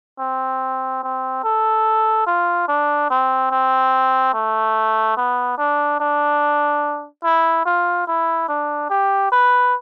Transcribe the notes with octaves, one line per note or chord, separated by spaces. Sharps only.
C4
C4
A4
F4
D4
C4
C4
A3
B3
D4
D4
E4
F4
E4
D4
G4
B4